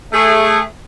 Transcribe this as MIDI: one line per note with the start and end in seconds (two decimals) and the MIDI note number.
0.13 0.61 57
0.13 0.61 68